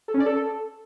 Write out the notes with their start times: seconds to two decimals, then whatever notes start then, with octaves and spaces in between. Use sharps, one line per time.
0.08 A4
0.14 C#4
0.20 D5
0.26 A4